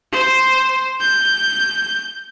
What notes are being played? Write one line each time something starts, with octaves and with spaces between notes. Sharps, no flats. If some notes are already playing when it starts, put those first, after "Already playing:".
C5
G6